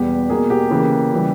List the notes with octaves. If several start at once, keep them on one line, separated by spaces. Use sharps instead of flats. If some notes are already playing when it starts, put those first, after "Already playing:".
Already playing: E2 B2 G3 B3 G4
B2 A#3 G#4
G4
C#3 E3 A#3
C#3 E3 G3